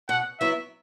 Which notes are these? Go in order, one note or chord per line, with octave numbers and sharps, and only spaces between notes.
B2 F#5
F#3 B3 E4 E5